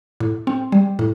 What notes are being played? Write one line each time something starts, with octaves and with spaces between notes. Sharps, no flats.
A2
C4
G3
A2